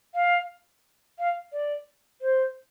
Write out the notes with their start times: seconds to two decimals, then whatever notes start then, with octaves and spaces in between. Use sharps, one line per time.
0.14 F5
1.19 F5
1.52 D5
2.21 C5